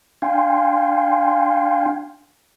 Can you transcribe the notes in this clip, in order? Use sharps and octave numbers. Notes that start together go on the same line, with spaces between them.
D4 F5 G5 G#5 C6